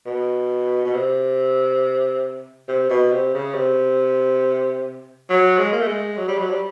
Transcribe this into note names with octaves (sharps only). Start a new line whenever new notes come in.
B2
B2
C3
C3
B2
C3
C#3
C3
F#3
G#3
A#3
A3
G#3
F#3
G3
F#3
G3